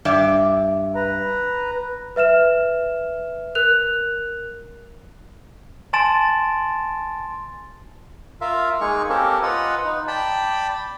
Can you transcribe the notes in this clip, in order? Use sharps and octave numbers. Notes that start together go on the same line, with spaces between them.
G2 D5 E5
B4 A#5
B4 E5 F6 E7
A#4 F#6 F7
G#5 A5 C6 A6 D7 E7
F4 A#4 E5 F5
G#3 A#3 D#4 G#4 C#6
A#3 C4 C#4 G4 A4 A#4
F4 B4 D#5 F#5
D#4
D5 G5 A5 B5